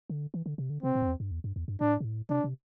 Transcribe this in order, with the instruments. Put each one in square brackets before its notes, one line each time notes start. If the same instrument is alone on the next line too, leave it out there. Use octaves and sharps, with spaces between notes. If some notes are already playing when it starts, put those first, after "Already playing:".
[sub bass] D3
E3
D3
C3
D3
[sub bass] C3 [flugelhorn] C4
[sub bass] A2
G2
E2
G2
E2
G2
E2
G2
[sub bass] A2 [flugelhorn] D4
[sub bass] C3
A2
[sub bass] C3 [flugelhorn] D4
[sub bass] C3